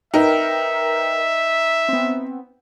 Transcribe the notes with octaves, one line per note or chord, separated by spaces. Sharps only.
D#4 A#4 B4 E5 G5
B3 C4